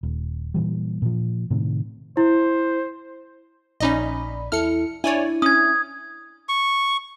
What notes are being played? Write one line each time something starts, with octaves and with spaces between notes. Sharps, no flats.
D#1
A#2 E3 G3
A#2 F3
A2 C3 D#3
E4 C5
A#1 C#4 D#4 D5 D#5 B5
E2 E4 A4 F6 C#7
D4 E4 C#5 D5 G#5
C#4 D#6 G#6
C#6